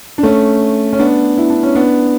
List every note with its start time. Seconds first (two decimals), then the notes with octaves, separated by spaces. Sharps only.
0.18 D4
0.23 A3 C#4
0.93 C#4
0.99 B3 D4
1.37 E4
1.50 D4
1.63 C#4
1.75 B3 D4